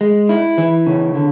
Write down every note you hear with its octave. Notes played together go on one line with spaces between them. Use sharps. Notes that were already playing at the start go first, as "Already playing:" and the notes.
G#3
E4
E3
C#3
D3